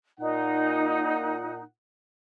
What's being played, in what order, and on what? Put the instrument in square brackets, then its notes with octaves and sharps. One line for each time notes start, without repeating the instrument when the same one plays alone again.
[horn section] A#2 F#5 [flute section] D#4